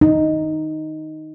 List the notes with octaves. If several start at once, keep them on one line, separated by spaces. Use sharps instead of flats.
D#4